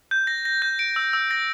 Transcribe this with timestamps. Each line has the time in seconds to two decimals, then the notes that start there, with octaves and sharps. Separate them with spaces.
0.11 G6
0.27 A#6
0.45 A#6
0.62 G6
0.79 D7
0.96 E6
1.13 E6
1.31 A#6